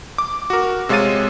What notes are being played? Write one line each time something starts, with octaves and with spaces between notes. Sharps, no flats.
D6
F#4 A#4
C3 G#3 C#5 F5 A6 D#7